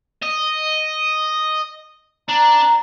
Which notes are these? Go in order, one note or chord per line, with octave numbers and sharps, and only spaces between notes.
D#5
D4 A#5